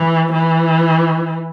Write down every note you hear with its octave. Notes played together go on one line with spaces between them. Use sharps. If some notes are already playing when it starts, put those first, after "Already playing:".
Already playing: E3
E3